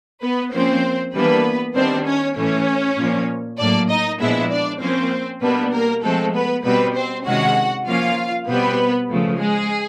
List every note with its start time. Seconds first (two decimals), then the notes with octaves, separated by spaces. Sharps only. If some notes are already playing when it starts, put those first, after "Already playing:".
0.21 B3 B4
0.53 F3 A#3 C4 C#4 C5
1.14 E3 G3 A#3 B3 D4 B4
1.75 D#3 G3 B3 C4 D4 C5
2.05 C#4 C#5
2.36 A2 E3 A3 C#4 C#5
2.97 A#2 F3 A#3
3.58 A2 F#3 A#3 D4 D5
3.89 D#4 D#5
4.20 A#2 F3 G#3 B3 D4 E4 E5
4.50 D4 D5
4.80 F3 A#3 C4 C#4 C5
5.41 B2 G3 A#3 B3 D4 B4
5.72 A#3 A#4
6.03 F3 G#3 A3 C4 A4
6.33 B3 B4
6.64 B2 G3 B3 C4 B4
6.95 C4 C5
7.25 C3 D#3 G#3 C#4 F#4 F#5
7.86 F3 A#3 C#4 F4 F5
8.47 B2 G3 B3 C4 B4
9.09 C#3 F3 A3
9.39 G#3 G#4